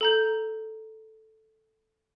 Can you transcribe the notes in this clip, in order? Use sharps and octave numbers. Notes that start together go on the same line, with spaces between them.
A4 A#5 G6